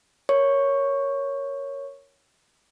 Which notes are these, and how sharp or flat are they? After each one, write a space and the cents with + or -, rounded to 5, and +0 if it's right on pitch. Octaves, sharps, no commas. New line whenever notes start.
A#4 +0 C#5 +0 C#6 +0